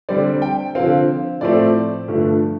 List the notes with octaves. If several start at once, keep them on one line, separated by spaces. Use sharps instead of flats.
D3 G3 C4 D5
G5
D3 F3 C4 F5
A2 F3 A3 C4 D5
G2 D3 F3 A3